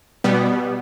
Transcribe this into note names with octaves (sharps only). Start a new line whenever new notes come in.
B2 G3 B3